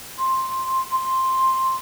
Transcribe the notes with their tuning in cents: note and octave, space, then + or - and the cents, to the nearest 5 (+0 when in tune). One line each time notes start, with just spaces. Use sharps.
C6 +5
C6 +5